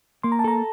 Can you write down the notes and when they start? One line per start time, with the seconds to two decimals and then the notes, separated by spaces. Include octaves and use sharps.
0.23 A#3 C6
0.32 A#5
0.39 A5
0.44 A4 A#5